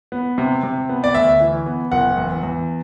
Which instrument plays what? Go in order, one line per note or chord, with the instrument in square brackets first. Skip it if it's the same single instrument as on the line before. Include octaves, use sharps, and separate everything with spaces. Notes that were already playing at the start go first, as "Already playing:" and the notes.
[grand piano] B3
C3
C3
B3
D5
D2 E5
E3
B3
F#1 F#5
E2
E2